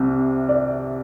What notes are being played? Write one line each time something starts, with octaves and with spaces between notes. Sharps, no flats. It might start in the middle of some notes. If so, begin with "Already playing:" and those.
Already playing: C2 C3
D5